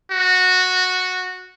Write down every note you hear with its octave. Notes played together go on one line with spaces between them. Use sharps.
F#4